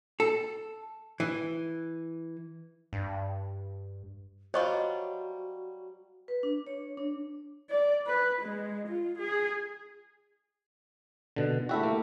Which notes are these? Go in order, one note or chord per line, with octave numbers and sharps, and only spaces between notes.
A4
E3
G2
F#3 G3 F4 F#4 C5 D#5 C#6
B4
D4
C#5
D4
D5
B4
G#3
F4
G#4
B2 D3
A3 E4 F#4 G4 E5
A#3